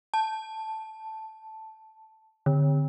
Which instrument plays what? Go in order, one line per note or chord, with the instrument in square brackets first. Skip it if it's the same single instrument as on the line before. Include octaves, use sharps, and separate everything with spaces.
[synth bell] A5
D3